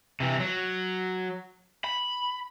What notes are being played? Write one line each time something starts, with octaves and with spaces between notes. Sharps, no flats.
C3 E3
F#3
B5